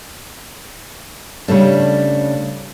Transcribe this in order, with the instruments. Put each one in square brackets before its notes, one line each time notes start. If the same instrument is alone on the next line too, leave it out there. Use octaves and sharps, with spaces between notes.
[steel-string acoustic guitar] C#3 G3 A3 D4